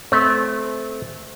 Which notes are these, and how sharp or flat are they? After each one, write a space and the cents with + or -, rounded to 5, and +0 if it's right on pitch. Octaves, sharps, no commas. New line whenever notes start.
A3 -20 C4 -20